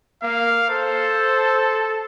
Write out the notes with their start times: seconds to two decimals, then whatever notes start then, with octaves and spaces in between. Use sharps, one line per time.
0.23 A#3 F5
0.70 A4 C5